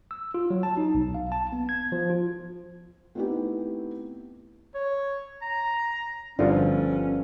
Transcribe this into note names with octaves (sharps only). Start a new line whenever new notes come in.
E6
F4
F#3
A5
D#4
B1
F5
A5
B3
G#6
F3
F4
A3 B3 C4 D#4 E4 G4
C#5
A#5
G1 F3 C#4 D4 F4 A4